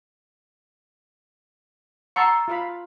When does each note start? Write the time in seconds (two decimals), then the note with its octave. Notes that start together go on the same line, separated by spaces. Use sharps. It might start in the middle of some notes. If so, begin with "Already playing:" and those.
2.16 F#5 A5 A#5 C6 C#6 E6
2.48 F4 F5 B5